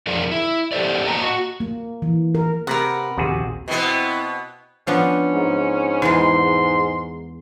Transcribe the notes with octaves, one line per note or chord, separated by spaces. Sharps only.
F2 F3 G#4 A#4 D5
E4
G4 A4 C5 D5
A#3 D#5 G5 A5 A#5
F#4
A#3
E3
A#4
C3 A#4 B4 F#5
A#1 D#2 C3 F#4 G#4
B2 B3 C4 E4
F3 B3 C#4 D4
G#2
E2 E3 G#3 C6